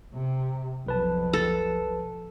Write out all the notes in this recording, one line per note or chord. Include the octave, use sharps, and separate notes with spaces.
C3
B1 F2 B4 A5
A4